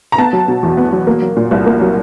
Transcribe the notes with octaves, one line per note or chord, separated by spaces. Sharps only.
A#5
B3 A5
F#3
B2
E2
B3
F#3
A#3
F#3
A#2
C2
A#3
F#3